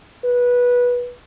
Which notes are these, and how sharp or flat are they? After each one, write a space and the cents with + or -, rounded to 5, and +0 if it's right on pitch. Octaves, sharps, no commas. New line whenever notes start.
B4 -15